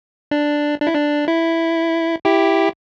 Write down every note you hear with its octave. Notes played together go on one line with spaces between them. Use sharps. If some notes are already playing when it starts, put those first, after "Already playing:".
D4
D4
E4
D4
E4
E4 G4